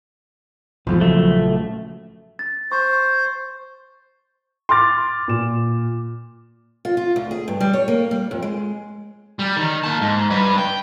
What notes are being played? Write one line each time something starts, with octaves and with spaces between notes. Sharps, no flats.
B1 E2 G#2 F3
A#1 C#3 F#3 A3
A6
C5 C#6
C6 D6 F6 A6
A#2 E7
F4
F4
D2
G#4
G2
G3
C#5
A#3
G3
F2
G#3
G3
D#3
A#3 A5
G#2
G2 B4
G5